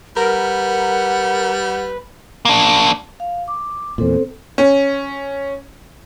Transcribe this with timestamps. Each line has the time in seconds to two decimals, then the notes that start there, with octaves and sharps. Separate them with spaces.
0.17 G3 A#4 B4 F#5
2.45 A#3 D4
3.20 F5
3.48 D6
3.98 E2 A#2 C4 A4 C5
4.58 C#4